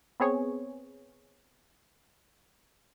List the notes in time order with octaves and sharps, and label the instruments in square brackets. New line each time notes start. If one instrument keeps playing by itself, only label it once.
[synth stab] B3 C4 G#4 C#5